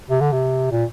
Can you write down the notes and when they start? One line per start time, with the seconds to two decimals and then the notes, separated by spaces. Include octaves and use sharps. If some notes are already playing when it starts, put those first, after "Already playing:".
0.10 C3
0.21 D3
0.32 C3
0.71 A#2